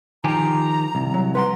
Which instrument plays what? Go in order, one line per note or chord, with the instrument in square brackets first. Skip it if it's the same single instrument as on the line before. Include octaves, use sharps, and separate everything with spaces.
[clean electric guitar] D#3 F3 G4 [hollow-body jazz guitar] G#5 [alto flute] A#5
[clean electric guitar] C2
[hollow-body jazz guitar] F#3
[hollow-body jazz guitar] B4 F#5 A#5 [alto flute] C6